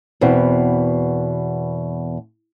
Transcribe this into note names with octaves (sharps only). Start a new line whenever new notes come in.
E2 B2 C4